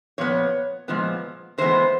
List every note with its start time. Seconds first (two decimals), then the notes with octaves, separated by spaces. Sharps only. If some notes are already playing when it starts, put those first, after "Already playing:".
0.18 A#2 F3 B3 C#5
0.88 A#2 F3 G#3 B3
1.58 A2 E3 G#3 B3 C5